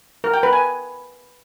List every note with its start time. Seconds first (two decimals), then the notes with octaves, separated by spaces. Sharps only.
0.24 A#4
0.34 G5
0.43 B4
0.53 G#5